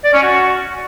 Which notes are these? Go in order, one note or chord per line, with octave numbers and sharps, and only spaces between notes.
D5
C#4
F#4